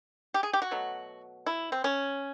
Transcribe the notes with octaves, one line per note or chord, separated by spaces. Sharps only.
G4
G#4
G4
F#4
B2 F#3 A3
E4
C4
C#4